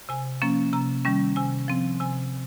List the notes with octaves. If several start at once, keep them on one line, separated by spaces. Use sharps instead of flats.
C3 G#5
F3 A#3 C#4
C3 A#5
D#3 G3 C#4
C3 G#5
F3 C4
C3 G#5